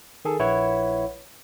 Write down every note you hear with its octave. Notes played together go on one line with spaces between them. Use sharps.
D#3 G#4 A4
A#1 E4 B4 C#5 F#5